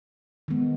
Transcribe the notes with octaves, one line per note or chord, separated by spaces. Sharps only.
D#3 G#3 B3